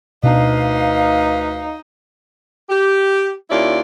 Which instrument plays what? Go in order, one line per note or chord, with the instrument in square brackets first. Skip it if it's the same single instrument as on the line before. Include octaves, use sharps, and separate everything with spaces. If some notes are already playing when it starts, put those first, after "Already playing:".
[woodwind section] D2 B4 F5 [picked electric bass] B2 D4 [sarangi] D#4
[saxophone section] G4
D#2 C#4 E4 F4 D5